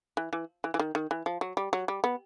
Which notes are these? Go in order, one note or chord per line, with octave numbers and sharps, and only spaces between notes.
E3
E3
E3
E3
D#3
D#3
E3
F3
F#3
G3
F#3
G3
B3